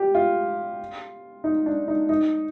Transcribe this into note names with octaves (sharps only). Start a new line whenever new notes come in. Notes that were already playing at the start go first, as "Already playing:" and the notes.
Already playing: G4
F4
D#4
D4
D#4
D#4